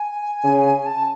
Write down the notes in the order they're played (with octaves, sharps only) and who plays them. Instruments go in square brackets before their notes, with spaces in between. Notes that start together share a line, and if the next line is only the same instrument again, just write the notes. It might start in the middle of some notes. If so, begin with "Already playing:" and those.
Already playing: [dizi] G#5
[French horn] C#3
[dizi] A5